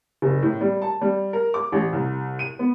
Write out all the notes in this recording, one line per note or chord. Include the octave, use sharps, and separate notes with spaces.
F#1
A2
G3
A5
G3
A#4
D6
A1
C2
D#7
B3